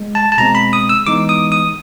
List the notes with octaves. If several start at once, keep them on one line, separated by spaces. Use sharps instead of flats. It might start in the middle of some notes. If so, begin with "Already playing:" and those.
Already playing: G#3
A5
A5
B2 G#3 C4 A#5
B5
D#6
E6
E3 G#3 B3 D#4 D6
D#6
D#6